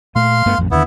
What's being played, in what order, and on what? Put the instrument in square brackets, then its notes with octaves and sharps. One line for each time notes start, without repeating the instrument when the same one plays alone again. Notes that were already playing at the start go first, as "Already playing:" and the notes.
[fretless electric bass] A#2 A3 [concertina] F5 C6
[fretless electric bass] G2 A3 B3
A1 F2
[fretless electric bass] D#2 D3 [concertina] B3 E4